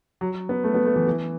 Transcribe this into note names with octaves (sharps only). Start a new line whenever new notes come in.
F#3
B3
A3
B3
A3
E3
E3